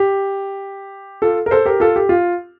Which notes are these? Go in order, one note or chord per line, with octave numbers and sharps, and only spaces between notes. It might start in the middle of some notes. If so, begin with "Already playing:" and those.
Already playing: G4
F4 A4
A#4
A4 C5
G4 A#4
F4 A4
G4
F4